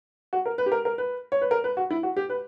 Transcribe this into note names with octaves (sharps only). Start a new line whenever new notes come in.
F#4
A#4
B4
G4
A#4
A#4
B4
C#5
B4
A#4
B4
F#4
E4
F#4
G4
B4